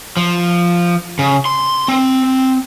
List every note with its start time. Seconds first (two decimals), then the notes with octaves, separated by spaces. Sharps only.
0.17 F3
1.19 C#3
1.45 C6
1.88 C4